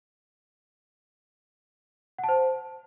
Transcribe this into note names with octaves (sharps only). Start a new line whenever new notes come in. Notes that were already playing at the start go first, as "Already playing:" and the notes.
F#5
A5
C5